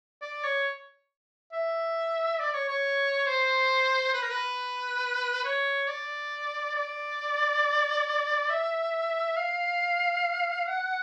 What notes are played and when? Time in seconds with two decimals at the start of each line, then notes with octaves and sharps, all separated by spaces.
0.22 D5
0.44 C#5
1.52 E5
2.40 D5
2.54 C#5
2.68 C#5
3.27 C5
4.14 B4
4.22 A#4
4.30 B4
5.44 C#5
5.88 D5
6.75 D5
8.50 E5
9.37 F5
10.67 F#5